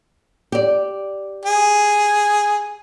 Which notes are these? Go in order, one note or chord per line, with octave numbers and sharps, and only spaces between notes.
G4 D5
G#4